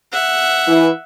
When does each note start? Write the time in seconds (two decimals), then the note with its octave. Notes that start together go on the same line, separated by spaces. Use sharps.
0.12 E5 F#5
0.68 E3